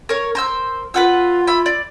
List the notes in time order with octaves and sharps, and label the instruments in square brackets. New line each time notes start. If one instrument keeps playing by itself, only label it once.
[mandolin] A#4 C#5
A#4 C5 E6
[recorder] F4 [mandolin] B4 F#5 E6
[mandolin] E4 B5
D5